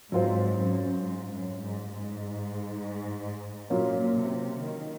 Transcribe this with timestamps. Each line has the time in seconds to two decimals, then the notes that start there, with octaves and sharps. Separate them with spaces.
0.12 G#2 F#3 C4 F4 C5
0.58 F#2
1.02 G#2
1.32 F#2
1.61 G#2
1.91 G#2
3.70 A#2 F#3 A#3 C#4 F4
4.15 C3
4.59 D#3